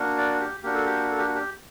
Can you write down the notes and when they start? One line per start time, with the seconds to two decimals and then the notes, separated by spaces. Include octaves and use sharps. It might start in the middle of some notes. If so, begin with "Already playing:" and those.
Already playing: A#3 D4 F#4
0.18 D5
0.40 G4
0.63 A#3 D4 F#4 G4
0.74 A4
0.86 G4
1.11 A4
1.18 G4
1.27 F#4
1.35 G4